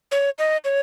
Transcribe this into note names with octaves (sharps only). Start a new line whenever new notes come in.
C#5
D#5
C#5